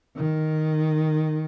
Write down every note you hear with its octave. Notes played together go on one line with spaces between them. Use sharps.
D#3